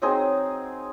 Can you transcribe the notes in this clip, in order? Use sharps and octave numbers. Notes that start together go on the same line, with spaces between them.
F#3 C4 D#4 G#4